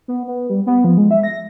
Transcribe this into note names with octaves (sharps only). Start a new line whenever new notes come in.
B3
B3
G3
B3
F3
G#3
E5
A#6